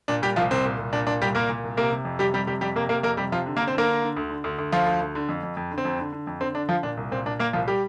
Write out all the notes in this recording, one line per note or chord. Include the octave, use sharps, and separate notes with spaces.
A#2 D4
A#2 G3 G4
C2 F3 F4
C2 C4
A#2
C2
A#2 D4
A#2 D4
C2 G3 G4
A#2 A#3 A#4
A#2
C2
C3 A#3 A#4
C3
F2
C3 G3 G4
F2 G3 G4
C3 G3 G4
F2 G3 G4
C3 A#3 A#4
C3 A#3 A#4
F2 A#3 A#4
C3 G3 G4
C3 F3 F4
D3
A#3 A#4
D3
C4 C5
D3 A#3 A#4
D3
D3
D2
D3
D2
D2
D2 F3 F4
D2
D2
D3
F2
F2
F2
D3
C4
F2
D3
D3
F2
D3 C4
D3 D4
D3 F3 F4
A#2 D4
C2
A#2 C4
A#2 D4
A#2 A#3 A#4
C2 F3 F4
G3 G4